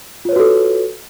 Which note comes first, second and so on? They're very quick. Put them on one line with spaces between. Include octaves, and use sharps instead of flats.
F4 C#5 B4 F#4 A4